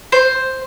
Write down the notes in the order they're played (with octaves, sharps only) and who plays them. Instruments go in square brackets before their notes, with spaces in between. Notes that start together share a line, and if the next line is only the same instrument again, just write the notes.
[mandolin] C5